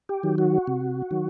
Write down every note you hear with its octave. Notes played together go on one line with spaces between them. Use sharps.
G4
D#3 F#3
F#4
C3
D#3 F#3